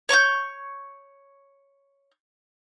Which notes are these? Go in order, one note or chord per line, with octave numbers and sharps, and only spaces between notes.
C#5 C#6 D6 G6